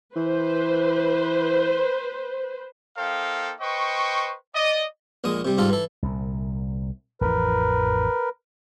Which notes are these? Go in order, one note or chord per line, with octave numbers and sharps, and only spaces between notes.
E3 B4 C5
A#3 D#4 A4 C5 F5 G5
B4 C5 D#5 G5 C#6
D5 D#5
A#1 A#2 G#3 D#6
C3 G3
G#2 G3 F4 A4
E3 A4
C2 A#2
A1 F2 E3 A#4 B4